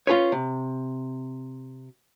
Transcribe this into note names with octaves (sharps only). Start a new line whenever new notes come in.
C#4 F4 G#4 B4 C#5
C3